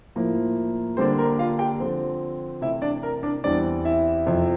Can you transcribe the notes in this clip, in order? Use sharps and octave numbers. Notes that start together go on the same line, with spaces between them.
A2 F3 A#3 E4
D3 G3 A#3 C4 D4 C5
A#4
F4 F5
G4 G5
D3 F3 C4
C3 E3 A3 E4 E5
D4 D5
A#4
D4 D5
E2 E3 G3 C4 D4 D5
E4 E5
F2 C3 F3